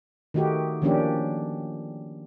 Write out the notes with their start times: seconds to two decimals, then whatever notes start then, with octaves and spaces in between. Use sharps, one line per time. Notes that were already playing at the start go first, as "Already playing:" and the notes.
0.34 D#3 A3 D#4 F#4 G4
0.82 D#3 F3 A#3 C#4 D4 G4